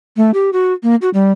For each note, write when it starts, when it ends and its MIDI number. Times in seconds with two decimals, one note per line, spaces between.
0.17 0.31 57
0.34 0.50 67
0.53 0.73 66
0.83 0.95 58
1.02 1.09 66
1.14 1.31 55